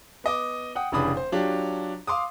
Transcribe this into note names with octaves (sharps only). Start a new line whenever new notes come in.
B3 D#5 D6
F#5 G5 D#6
F1 C#3 E3 D4 B5 D#6
C5
F#3 D4 F4 G4
F5 C6 D6 D#6